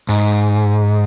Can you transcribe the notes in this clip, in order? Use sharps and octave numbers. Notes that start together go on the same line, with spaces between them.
G#2